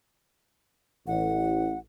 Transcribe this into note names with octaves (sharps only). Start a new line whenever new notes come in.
A1 F#5